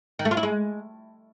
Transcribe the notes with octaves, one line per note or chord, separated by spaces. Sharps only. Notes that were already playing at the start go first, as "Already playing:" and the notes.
D#3
A3
F4
E4
G#3